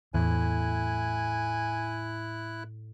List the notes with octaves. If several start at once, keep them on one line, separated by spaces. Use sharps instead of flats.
E2 A2 E4 G#5 F#6